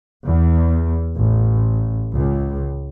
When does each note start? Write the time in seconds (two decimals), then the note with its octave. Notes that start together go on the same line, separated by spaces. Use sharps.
0.25 E2
1.15 A1
2.15 C#2